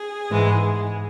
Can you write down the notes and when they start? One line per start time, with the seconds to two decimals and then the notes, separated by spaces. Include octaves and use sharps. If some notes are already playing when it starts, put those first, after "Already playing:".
Already playing: G#4
0.30 G#2 E3 G#3